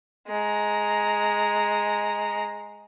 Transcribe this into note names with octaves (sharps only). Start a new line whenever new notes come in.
G#3 A#5